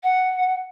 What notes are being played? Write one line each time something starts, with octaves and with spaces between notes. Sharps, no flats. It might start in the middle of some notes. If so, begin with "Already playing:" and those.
F#5